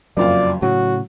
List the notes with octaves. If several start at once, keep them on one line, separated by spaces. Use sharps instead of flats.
F#1 F2 F#3 D5 F5
A2 C#3 F#3 F#4